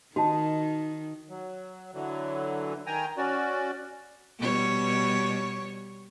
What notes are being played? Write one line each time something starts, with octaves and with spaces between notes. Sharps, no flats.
D#3 D#4 F#4 A5
F#3
D3 E3 F#3
D#3 G5 G#5 A#5
C#4 F#4 D5
B2 G3 C#5